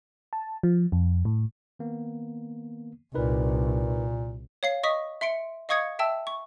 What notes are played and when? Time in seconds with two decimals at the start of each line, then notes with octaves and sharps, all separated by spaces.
0.33 A5
0.63 F3
0.92 F2
1.25 A2
1.79 D#3 A#3 B3
3.14 C2 A#2 D#4 A#4 B4
4.63 C#5 F5 C7
4.83 D#5 C#6 D#6 B6
5.21 E5 C6 C#7 D7
5.69 D#5 F5 C#6 D#6 G#6 C#7
5.99 E5 G5 A5 E6
6.27 C#6